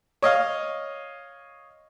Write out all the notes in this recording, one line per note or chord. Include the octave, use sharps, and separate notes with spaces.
C#5 D#5 F5